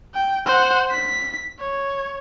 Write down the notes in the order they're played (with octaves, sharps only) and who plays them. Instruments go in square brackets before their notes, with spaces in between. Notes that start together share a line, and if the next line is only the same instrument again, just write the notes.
[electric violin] G5
C5 F#5
B6
C#5